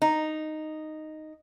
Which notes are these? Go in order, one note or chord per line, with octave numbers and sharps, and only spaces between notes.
D#4